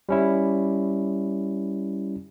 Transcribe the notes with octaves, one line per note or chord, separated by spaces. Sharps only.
G3 C#4 E4